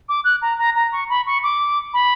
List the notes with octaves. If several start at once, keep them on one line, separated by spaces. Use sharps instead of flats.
D6
F#6
A#5
A#5
A#5
C#6
B5
C#6
D6
B5